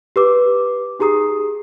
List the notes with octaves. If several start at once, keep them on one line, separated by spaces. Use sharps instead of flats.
G4 B4 D6
D#4 G4 G#4 A#5 D#6 C7